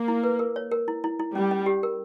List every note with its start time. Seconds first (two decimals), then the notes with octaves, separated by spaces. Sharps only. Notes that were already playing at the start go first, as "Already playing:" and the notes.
Already playing: A#3
0.08 E4
0.24 B4
0.39 A#4
0.56 C#5
0.71 A#4
0.88 E4
1.04 E4
1.19 E4
1.35 G3 C#4
1.51 C#4
1.66 G4
1.83 A#4